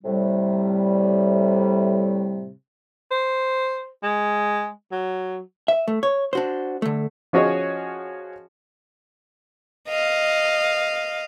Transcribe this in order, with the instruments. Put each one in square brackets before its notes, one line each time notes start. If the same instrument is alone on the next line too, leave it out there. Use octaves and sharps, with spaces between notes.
[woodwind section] A2 C3 G3
[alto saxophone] C5
G#3
F#3
[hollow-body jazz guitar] E5
A3
C#5
D4 F#4 C5
D3 A3
[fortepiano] F3 C#4 F#4 G#4 C#5 D#5
[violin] D#5 F5